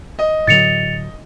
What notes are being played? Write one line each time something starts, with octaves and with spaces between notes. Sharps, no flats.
D#5
A2 D3 F#3 A6 C#7 F7